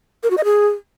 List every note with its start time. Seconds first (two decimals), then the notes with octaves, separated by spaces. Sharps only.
0.23 A#4
0.30 F#4
0.37 D#5
0.44 G#4